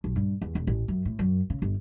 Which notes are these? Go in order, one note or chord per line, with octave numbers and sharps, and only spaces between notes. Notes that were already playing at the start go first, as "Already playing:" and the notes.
B1
G2
E2
E1
A1
F#2
A2
F#2
C#3
G1